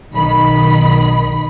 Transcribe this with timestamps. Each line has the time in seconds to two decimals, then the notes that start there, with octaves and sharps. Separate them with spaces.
0.13 B1 D#3 B5